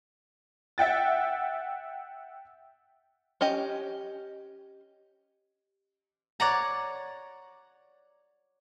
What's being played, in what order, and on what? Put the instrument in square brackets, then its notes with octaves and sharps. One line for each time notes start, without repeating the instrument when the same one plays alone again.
[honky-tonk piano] E5 F#5 G5 A6
[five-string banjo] C#4 G4 D#5
[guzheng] C#5 D5 F#5 A#5